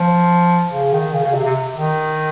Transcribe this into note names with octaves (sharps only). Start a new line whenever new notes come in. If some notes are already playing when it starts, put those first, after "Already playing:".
Already playing: F3
C#3
D#3
C#3
C#3
C3
C3
D#3